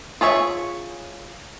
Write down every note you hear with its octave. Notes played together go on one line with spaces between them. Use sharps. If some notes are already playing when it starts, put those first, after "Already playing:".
F4 G#4 C#5 E5